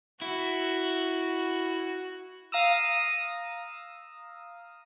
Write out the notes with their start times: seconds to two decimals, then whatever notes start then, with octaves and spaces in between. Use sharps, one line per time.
0.22 E4 F#4
2.52 F5 A#5 D#6 E6